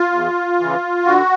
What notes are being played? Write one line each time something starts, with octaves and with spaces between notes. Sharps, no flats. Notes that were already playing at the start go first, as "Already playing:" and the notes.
Already playing: F4
E2
C#3 E3
D3 F#4